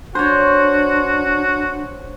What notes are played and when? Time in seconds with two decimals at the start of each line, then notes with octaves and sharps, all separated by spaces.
0.15 D4 F#4 C5 C#5